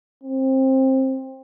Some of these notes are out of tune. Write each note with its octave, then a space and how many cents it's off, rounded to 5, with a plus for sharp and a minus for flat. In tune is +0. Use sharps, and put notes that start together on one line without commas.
C4 +20